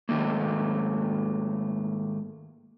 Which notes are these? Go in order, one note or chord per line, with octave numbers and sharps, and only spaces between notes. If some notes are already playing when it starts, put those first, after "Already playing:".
G#2 D#3 A3 A#3